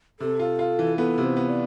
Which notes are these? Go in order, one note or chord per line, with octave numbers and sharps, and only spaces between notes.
C3 A4
F4
F4
E3
B3 A4
C3
C5
B3
D5